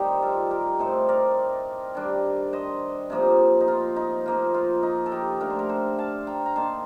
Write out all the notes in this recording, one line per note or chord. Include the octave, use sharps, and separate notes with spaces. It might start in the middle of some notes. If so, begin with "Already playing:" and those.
Already playing: D#3 G3 C4 D#4 G4 C5
F4 A4
G4 A#4
A2 A3 C4 D#4 A4 C5
A#4 D5
D#3 G3 D4
C5 D#5
C3 F3 A#3 D#4
D#4
F4
D#4
F3 A#3 D#4 F4
F4
D#4
A4
D#4 G4
D3 A3 D4 A#4
C5
G4 A#4
A4 C5
F5 A5
G5 A#5
A#5
D#3 A#3 D#4 A5 C6